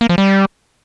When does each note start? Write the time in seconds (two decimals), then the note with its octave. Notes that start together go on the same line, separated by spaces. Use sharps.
0.01 A#3
0.09 F3
0.18 G3